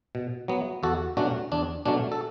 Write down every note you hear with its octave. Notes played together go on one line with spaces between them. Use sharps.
B2
F#3 B3
E2 F#4 A4
B2 F#3 A3 C#4 D4 F#4
E2 D4
B2 F#3 A3 C#4 D4
A4